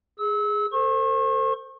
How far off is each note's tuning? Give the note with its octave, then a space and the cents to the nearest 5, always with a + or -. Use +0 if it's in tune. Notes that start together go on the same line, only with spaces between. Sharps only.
G#4 +0 E6 -30
A4 +40 C5 +0 C#6 -40